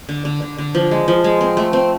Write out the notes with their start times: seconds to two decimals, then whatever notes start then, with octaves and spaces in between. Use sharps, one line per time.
0.09 D3
0.25 D3
0.42 D3
0.58 D3
0.75 F3
0.91 G#3
1.08 F3
1.24 G#3
1.41 C4
1.57 A3
1.73 C4